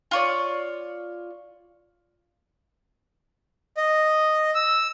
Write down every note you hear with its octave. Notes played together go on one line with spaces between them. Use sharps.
F4 C#5 D5
D#5
E6